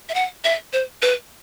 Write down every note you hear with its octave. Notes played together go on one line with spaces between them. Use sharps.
E5
F#5
E5
C5
B4